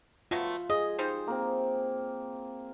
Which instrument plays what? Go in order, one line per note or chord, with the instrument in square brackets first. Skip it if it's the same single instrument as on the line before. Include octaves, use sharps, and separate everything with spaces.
[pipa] F#3 A3 B3 [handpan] F4
[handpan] G#4 [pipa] D#5
[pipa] G3 D#4 C5
[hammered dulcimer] A#3 C4